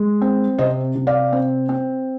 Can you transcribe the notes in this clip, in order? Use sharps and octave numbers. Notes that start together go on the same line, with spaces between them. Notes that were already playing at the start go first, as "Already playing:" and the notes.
Already playing: G#3
C4
C3 C5 D#5
C3
D5 F5
C4
C4